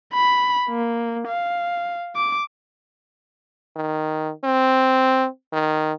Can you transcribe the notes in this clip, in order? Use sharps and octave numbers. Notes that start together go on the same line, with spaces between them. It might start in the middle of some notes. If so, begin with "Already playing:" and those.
B5
A#3
F5
D6
D#3
C4
D#3